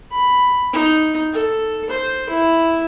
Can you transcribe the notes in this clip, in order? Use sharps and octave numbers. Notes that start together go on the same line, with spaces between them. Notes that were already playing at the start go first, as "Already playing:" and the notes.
B5
D#4
A4
C5
E4